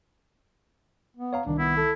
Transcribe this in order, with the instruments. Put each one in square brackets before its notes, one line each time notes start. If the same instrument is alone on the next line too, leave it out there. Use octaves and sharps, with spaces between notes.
[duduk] B3
[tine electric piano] C#5 F5 A#5
[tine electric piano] C2 D#3 [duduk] D4
[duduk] B3 [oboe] E4
[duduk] A4